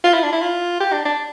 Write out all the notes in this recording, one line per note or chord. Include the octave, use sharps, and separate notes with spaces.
F4
E4
D4
E4
F4
G4
D4
D4